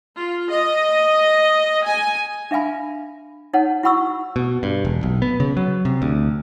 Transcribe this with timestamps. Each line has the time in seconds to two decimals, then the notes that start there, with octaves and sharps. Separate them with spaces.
0.17 F4
0.52 D#5
1.84 G#5
2.51 D4 E5 F5 G#5 B5
3.53 D#4 C#5 F#5 A5
3.83 E4 F#4 F#5 B5 C#6 E6
4.36 B2
4.63 G2
4.85 E1
5.03 B1
5.22 B3
5.40 C#3
5.57 F#3
5.85 C3
6.02 D2